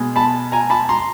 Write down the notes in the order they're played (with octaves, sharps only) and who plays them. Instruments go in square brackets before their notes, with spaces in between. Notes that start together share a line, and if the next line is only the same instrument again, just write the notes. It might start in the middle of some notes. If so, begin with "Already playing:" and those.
Already playing: [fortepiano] B2 G#3
A5 B5
G#5 A#5
A5 B5
A#5 C6